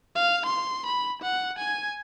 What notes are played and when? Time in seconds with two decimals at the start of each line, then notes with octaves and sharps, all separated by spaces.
0.15 F5
0.46 C6
0.86 B5
1.22 F#5
1.58 G#5